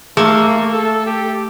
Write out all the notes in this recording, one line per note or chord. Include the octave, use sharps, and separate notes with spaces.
A3 A#3 G#4
A4
G4